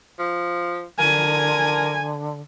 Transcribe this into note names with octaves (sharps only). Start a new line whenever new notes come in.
F3
D3 A#4 G#5